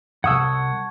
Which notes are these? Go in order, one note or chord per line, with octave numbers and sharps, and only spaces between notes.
C2 F2 F#5 A5 C#6 D#6 E6 G#6
F#5